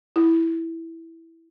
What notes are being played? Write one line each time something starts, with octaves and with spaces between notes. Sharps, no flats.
E4